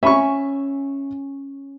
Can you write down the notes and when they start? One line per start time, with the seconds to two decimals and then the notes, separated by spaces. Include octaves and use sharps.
0.03 C#4 E5 B5 C#6